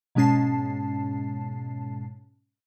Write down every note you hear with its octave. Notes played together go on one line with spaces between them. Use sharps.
G#2 B2 G#3 C#4 A5 C7